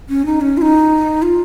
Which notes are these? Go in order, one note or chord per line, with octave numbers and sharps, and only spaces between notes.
C#4
D#4
C#4
F4
D#4
F4